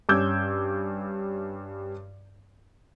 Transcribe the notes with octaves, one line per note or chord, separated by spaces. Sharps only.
G2 C#4 D6 E6 G6 G#6